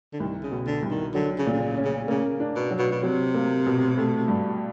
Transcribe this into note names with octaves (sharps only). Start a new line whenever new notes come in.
D3
C2 D#3
C#3
B2
D3
C2
D#3
D3 F#3
C#3
A#2
D3
C#3
C#4
C#3
C#3 A#3
D4
B2
F#3
B2
B2
C3 F#3
A#3
B2
A3
G2